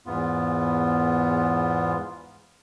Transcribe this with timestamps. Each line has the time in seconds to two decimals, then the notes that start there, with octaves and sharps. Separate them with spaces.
0.06 E2 G#2 B3 F4